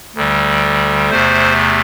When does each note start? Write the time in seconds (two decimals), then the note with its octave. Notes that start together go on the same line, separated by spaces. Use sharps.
0.16 D2 D3 G3
1.11 E2 C3 A3 C5